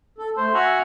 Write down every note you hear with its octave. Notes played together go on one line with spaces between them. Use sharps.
A4
A3 C5
F#4 E5 G#5 A#5